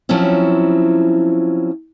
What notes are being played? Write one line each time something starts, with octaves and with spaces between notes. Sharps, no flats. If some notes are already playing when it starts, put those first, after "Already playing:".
F3 F#3 C4 C#4 E4